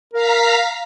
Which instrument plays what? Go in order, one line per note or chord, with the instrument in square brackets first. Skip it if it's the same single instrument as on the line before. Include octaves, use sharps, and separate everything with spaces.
[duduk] A#4 [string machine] F5 A#5 B6